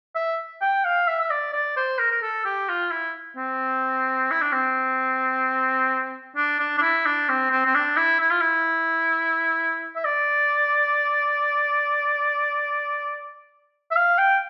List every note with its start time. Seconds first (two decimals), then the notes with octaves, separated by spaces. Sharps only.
0.15 E5
0.61 G5
0.85 F5
1.08 E5
1.21 E5
1.30 D5
1.53 D5
1.77 C5
1.99 A#4
2.11 A#4
2.22 A4
2.45 G4
2.69 F4
2.91 E4
3.37 C4
4.31 E4
4.41 D4
4.52 C4
6.36 D4
6.60 D4
6.78 D4
6.82 E4
7.06 D4
7.29 C4
7.51 C4
7.66 C4
7.75 D4
7.97 E4
8.20 E4
8.31 F4
8.41 E4
9.96 E5
10.05 D5
13.91 E5
13.96 F5
14.18 G5